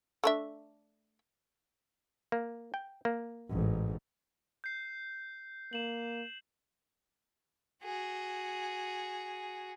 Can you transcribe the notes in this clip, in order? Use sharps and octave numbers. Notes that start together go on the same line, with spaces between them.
A3 D4 E5
A#3
G5
A#3
A1 G#2
G6 C7
A#3 E7 F#7
F#4 G#4